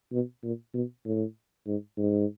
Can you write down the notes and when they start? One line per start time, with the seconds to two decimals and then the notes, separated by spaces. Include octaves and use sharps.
0.12 B2
0.43 A#2
0.74 B2
1.05 A2
1.66 G#2
1.98 G#2